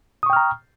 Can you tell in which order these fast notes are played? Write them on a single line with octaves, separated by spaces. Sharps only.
D#6 C#6 G5 F6 A#5